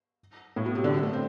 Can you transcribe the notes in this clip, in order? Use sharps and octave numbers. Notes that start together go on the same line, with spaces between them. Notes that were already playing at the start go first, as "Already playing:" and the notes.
A2
B2
C3
D3
F#3
A3
C4